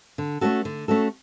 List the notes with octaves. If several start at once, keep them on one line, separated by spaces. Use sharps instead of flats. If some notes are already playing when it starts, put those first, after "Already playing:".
D3
A3 C#4 F#4 A4
D3
A3 C#4 F#4 A4